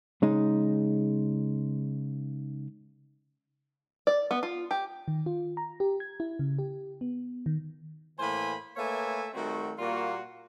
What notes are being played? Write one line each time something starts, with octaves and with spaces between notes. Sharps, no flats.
C#3 G#3 D#4
D5
B3
F4
G4
D#3
F4
A#5
G4
G#6
E4
C#3
G4
B3
D#3
A2 E3 A#3 C5 G#5 B5
A3 A#3 B4 C#5 E5 G#5
D#3 G3 A3 C4 F#4
A#2 G3 A#3 F4 F#4